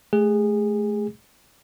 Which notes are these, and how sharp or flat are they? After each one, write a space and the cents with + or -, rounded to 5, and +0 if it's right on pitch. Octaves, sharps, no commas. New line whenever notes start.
A3 -30 G#4 -20